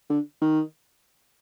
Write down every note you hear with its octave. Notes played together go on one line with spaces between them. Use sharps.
D3
D#3